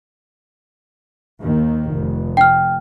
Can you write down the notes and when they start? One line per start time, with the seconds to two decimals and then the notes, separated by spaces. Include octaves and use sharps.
1.41 D#2 D#3
1.91 F1
2.37 G5 F6